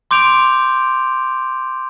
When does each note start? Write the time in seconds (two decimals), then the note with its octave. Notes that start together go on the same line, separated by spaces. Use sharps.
0.11 C6 D6 G6 D7 F7